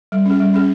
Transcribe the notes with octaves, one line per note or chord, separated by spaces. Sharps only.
G3
C#4 G#4
G3
C#4 G#4